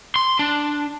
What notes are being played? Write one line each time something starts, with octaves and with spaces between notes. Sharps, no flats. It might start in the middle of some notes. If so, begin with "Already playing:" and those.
C6
D4